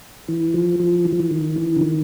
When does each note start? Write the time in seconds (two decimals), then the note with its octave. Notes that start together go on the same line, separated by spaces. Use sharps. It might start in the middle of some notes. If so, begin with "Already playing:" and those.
0.28 E3
0.54 F3
0.80 F3
1.05 E3
1.12 F3
1.20 E3
1.31 D#3
1.56 E3
1.76 D3
1.81 D#3